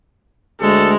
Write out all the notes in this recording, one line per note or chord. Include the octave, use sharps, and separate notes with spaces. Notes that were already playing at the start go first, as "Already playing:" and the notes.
D2 G#3 A4